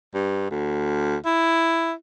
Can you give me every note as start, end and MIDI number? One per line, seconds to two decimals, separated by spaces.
0.14 0.49 43
0.51 1.17 38
1.25 1.92 64